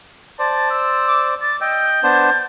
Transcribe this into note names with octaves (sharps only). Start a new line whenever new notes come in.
C5 D5 A5
E6
D6
D6 A6
D#5 G5 E6 G6
B3 D4 C5 A5